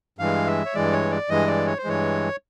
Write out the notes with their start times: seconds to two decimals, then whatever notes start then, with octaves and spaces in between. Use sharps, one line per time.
0.19 G2 E3 G#3 F5
0.47 E5
0.65 C#5
0.74 G2 E3 G#3 D5
0.92 C#5
1.10 D5
1.29 G2 E3 G#3 D#5
1.47 D5
1.67 C#5
1.78 C5
1.84 G2 E3 G#3 C#5